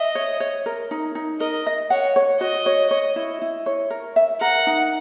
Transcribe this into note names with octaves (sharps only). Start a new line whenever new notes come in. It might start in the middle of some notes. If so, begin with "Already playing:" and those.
Already playing: D#5 E5
C#5
C#5
A#4
D#4
D#4
A#4 D#5
D#5
C#5 F#5
C#5
F#4 D#5
C#5
C#5
E4
E4
C#5
A#4
E5
A#4 F#5
D#4